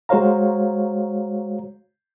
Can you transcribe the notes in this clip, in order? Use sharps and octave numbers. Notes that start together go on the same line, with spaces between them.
G#3 F#4 C5 C#5 F5 A#5